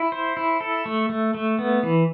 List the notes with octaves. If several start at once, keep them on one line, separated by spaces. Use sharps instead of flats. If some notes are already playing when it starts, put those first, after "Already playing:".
Already playing: E4
C5
E4
A4
A3
A3
A3
B3
E3